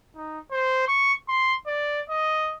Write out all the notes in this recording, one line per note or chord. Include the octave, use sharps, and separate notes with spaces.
D#4
C5
C#6
C6
D5
D#5